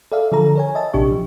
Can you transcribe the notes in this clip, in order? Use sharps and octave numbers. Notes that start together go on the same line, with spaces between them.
A4 D5 E5 F5
D3 F3 A4 A#5
A#4 C#5 G#5
D#5 E5 A5
A#1 C3 D4 G4 C#6
F3